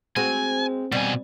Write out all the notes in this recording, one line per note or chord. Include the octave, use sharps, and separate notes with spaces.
G#3 C4 F#4 G#5
B2 G3 G#5